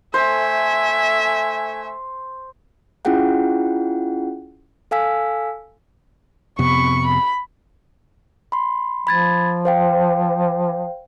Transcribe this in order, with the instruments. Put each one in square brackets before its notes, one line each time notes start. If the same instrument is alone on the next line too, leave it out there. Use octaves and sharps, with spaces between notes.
[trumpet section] A3 G#5 [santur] C5 [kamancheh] E5
[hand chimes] C#4 E4 F4 G#4 F#5 G5
A4 F5 G#5 E6 B6
[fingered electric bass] F2 C3 B3 [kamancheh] B5 C#6
[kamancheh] B5
[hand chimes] B5 C6
[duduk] F3 [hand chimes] B5 G#6 A6
[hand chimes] C5 F5 G5